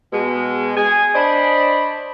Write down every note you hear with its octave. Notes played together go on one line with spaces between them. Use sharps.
B2 G#3
G#4 G#5
D4 C5 D5 D#5 B5